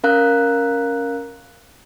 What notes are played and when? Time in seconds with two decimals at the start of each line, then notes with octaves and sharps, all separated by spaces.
0.04 C#4 A#4 F5 A#5 F#6